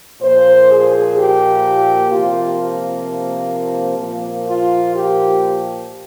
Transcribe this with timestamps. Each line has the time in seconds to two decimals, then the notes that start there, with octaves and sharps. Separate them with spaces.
0.21 A#2 F3 A#3 C5
0.69 G#4
1.16 G4
2.10 C3 F3 A#3 F4
3.97 A#2 F3 A#3
4.44 F4
4.91 G4